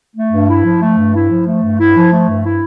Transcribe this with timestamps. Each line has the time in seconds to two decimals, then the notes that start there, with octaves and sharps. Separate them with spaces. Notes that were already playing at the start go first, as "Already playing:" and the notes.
0.15 A3
0.32 G2
0.48 E4
0.64 F3
0.81 A3
0.98 G2
1.14 E4
1.30 F3
1.46 A3
1.63 G2
1.78 E4
1.96 F3
2.12 A3
2.28 G2
2.45 E4